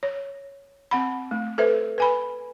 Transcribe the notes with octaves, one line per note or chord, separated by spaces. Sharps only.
C#5
C4 F#5 B5
A3
A4 B4 C5 E5
B4 G#5 B5